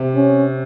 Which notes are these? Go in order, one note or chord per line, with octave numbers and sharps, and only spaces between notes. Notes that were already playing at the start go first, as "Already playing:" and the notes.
Already playing: C3
C#4